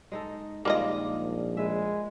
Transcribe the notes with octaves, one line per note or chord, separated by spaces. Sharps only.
G#3 D#4 A4
A#1 D#3 G3 G#3 A#3 F4 D#5
G#3 B4 E5